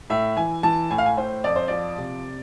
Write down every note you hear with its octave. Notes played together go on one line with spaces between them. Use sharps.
A2 E5
E3 G#5
E3 A5
A2 G#5
F5
G#5
A2 C5
F2 D5
C5
F3 D5
C3